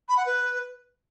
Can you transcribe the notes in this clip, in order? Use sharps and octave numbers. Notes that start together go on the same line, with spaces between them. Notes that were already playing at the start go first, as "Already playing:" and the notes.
B5
F#5
B4